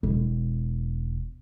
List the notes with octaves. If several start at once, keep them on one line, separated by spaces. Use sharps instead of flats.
E1